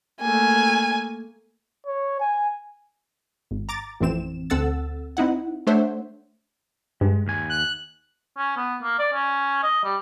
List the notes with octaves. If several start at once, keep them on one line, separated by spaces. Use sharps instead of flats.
A3 A#3 G#5
C#5
G#5
G#1
A#5 D6 A6
A1 F2 E3 C4 E7
D2 C4 A4 F#5 E6 A6
C4 D#4 E4 F#5
A3 D4 C5 C#5 E5 F#5
G2 G#3
D#2 G#5
F#6
C#4
B3
A#3
D5
C#4
D#5
G3